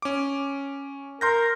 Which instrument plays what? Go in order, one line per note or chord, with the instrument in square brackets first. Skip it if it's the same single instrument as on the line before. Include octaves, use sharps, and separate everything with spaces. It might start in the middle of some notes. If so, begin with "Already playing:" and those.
[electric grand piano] C#4 D6
[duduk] A#4 [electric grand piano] C6 G6 A#6